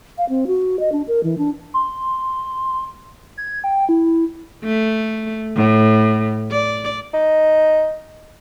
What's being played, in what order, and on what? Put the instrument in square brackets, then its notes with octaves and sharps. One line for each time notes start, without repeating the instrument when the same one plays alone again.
[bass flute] F5
C4
F#4
D#5
D4
A#4
E3
D4
[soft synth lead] C6
G#6
G5
E4
[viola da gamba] A3
A2
D5
[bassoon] D#4